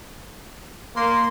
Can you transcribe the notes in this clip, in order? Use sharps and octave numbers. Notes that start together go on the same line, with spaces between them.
A#3 C6